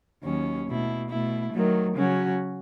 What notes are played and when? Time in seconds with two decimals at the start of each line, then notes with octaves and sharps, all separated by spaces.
0.23 D#2 D#3 F#3 C#4
0.66 B2 A3 E4
1.09 B2 A3 E4
1.52 D#3 F#3 A3
1.95 C#3 F#3 C#4 F#4